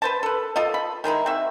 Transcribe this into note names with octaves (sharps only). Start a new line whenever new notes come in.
B4 C5 A5
A4 B4
F4 A4 D#5
B5
D#3 G#3 D#4 E4
C4 F#4 E5